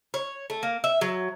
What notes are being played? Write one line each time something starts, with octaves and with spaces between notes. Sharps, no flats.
C#5
A3
A#3
E5
F#3